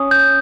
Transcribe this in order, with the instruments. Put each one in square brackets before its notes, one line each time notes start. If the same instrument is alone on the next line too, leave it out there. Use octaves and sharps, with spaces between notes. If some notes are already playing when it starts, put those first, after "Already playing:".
Already playing: [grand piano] C#4 [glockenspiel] D#6
[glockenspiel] G6